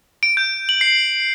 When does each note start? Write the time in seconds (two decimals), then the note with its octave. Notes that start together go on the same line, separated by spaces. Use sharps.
0.23 D7
0.37 G6
0.69 F#7
0.81 C7